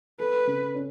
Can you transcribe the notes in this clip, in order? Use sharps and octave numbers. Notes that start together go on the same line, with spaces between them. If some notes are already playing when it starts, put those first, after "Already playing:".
A4 B4
C#3
C#4